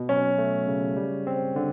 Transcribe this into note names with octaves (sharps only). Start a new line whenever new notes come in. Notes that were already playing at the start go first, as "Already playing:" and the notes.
Already playing: B2
F#3 C#4
A3
C#3
G3
C4
D3